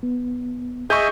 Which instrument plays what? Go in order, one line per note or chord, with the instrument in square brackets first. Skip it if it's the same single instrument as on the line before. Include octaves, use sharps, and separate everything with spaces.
[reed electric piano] B3
[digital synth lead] G#4 [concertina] D#5 E5 G#5 [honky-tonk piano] C#6 G6